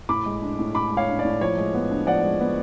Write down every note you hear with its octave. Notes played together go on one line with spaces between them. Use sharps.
A2 B5 D6
G#3
D4
A2
A2 B5 D6
G#3
C#5 F5
D4
D5
A2
F3 C#5
G#3
B3
D4
F3 D5 F#5
G#3
B3